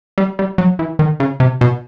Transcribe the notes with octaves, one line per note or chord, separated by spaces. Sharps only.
G3
G3
F#3
E3
D#3
C#3
C3
B2